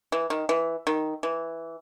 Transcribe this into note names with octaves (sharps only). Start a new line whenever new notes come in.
E3
D#3
E3
D#3
E3